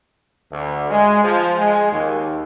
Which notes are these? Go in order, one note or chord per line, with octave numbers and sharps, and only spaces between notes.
D2
G#3
F3
G#3
D#2